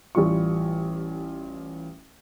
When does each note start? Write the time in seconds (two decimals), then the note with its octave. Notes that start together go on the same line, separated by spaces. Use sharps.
0.15 A1 E3 G3 F4 C#6